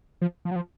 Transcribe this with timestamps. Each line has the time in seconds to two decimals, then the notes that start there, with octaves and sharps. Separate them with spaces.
0.22 F3
0.45 F3
0.51 F#3
0.56 F3